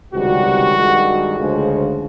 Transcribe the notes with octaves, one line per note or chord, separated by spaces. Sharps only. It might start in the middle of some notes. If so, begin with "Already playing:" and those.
C#2 C3 D#3 G3 F#4
G2 D#3 G#3
D2 C#3 F3 G#3